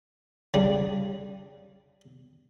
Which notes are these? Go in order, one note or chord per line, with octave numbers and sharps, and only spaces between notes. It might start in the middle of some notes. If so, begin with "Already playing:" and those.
C#3 G3 D4